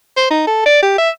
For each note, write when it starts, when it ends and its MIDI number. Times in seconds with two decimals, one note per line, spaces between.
0.17 0.30 72
0.31 0.45 63
0.47 0.61 69
0.66 0.82 74
0.82 0.97 67
0.98 1.09 76